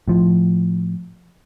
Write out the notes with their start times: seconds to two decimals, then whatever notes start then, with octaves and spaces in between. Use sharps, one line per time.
0.08 A2 F3